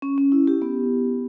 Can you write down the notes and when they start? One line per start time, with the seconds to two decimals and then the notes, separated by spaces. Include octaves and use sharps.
0.02 C#4
0.18 C#4
0.32 E4
0.47 G4
0.62 B3